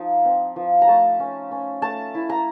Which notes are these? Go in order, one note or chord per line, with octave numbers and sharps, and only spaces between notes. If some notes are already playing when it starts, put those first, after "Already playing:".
Already playing: F3 D#4
C4
F3
A#5
A3 A5
C#4
C#4
A3 A5
E4
A#5